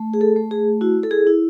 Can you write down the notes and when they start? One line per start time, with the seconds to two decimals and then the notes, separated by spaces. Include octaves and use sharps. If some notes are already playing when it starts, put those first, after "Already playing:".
Already playing: A3
0.14 G#4
0.21 A4
0.36 A3
0.51 G#4
0.81 E4 F#4
1.03 A4
1.11 G#4
1.27 E4